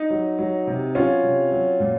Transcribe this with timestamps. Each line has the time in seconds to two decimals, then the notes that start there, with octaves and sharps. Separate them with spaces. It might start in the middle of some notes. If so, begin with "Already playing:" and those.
Already playing: D#4
0.10 F#3
0.39 F#3
0.67 C3
0.95 F#3 C#4 F4
1.23 C3
1.51 F#3
1.80 A#2